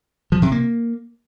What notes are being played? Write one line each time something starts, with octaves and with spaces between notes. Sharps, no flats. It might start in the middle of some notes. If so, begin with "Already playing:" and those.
F3
C3
A#3